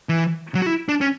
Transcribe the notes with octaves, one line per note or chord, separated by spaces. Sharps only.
E3
F#3
F#4
E4
D4
C#4